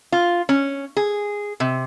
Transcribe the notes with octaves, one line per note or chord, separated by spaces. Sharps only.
F4
C#4
G#4
C3